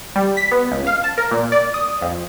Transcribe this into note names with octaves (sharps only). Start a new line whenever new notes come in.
G3
B6
B3
C#2
F5
A5
A#4
A#2
D5
D#6
F2